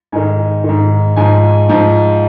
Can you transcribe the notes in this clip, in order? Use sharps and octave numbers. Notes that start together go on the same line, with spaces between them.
G#2 D#3 G#5
G#2 D#3
G#2 F3 G#5
G#2 F3